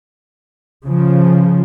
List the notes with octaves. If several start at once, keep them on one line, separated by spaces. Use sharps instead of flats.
C#3 F3